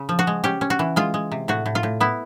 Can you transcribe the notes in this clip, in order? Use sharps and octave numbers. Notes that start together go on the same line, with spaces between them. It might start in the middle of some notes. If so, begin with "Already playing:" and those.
Already playing: C#3
F3
F#4
G#3
C#4 G4
C#4
F#4
E3
G#3 F4
G#3
C3
A2 F#4
A2
F4
A2
B3 E4